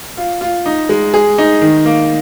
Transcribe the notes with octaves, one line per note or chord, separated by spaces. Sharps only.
F4
F4
D#4
G#3
G#4
D#4
D#3
A#3